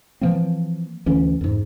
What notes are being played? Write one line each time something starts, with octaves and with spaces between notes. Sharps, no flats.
E3 F3 A#3 C4
D2 E3 C#4
F2 G#2